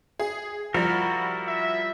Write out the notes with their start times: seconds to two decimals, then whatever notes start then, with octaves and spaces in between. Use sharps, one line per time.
0.19 G#4
0.74 F3 G3 E4 F#4 A#4
1.47 E5